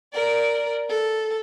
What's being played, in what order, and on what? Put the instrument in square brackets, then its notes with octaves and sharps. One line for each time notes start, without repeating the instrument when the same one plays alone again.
[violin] A#4 D5
A4